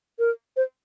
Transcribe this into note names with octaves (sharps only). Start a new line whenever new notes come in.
A#4
C5